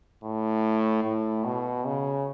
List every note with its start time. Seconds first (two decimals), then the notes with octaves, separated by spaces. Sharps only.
0.23 A2
1.04 A2
1.44 B2
1.86 C#3